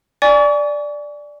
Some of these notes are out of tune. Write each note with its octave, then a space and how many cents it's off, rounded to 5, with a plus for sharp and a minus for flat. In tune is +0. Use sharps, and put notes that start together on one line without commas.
D5 +0 G#5 +0 C#6 +40